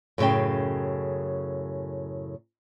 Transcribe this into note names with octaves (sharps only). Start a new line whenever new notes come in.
F#2 A2 C#3 D#5 G5